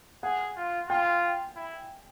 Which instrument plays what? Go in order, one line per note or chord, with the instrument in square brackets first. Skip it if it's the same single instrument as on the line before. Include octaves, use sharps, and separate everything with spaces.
[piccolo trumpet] G#4 [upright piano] F#5
[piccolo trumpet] F4
[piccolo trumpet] F4 [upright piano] G5
[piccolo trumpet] E4